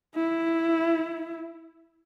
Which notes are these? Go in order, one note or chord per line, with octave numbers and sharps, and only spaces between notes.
E4